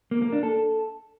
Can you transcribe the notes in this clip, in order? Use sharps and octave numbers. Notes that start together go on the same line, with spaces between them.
A#3
A#3
D4
A4